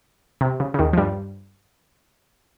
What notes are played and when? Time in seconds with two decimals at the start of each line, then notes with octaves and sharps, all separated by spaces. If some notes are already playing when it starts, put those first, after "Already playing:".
0.41 C3
0.60 C#3
0.74 C#3
0.79 D#2 D#3
0.93 F3
0.97 G2 G3